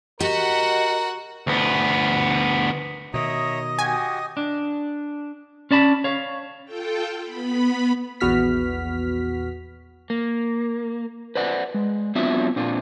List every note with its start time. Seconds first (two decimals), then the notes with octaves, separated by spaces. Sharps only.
0.20 F#4 G4 A#4 D#5 F#5
1.47 D2 B3
3.14 B2 D#3 C#5 D#5 E5 A#5 D#6
3.79 F#4 G4 G#5
4.37 D4
5.71 C#4 D5 A5 B5
6.04 C#5 F5
6.65 F4 A4 G5
7.22 B3 B5
8.20 A#1 E2 B3 F#4 F6 B6
10.10 A#3
11.35 B4 C5 D5 F#5
11.74 G#3
12.15 F#3 B3 C4 D4 F4 E5
12.56 A#2 C4 D4 F4